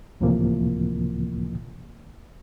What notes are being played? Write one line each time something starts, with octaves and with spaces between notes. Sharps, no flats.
C#2 A2 C3 E3 F3 A#3